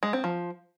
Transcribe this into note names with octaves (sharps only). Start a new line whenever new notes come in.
G#3
C4
F3